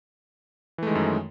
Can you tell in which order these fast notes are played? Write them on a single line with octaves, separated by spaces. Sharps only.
E3 A3 G#3 D#3 F#2